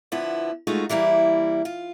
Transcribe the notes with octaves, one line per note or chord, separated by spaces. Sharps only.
D3 F3 B3 E4
G#3 A3 D#4 F4 F#4
E3 G3 A#3 E4
F4